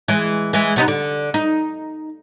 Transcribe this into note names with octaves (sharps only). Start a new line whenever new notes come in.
E3 G#3
E3 G#3
C3 B3 D#4
D3
D#4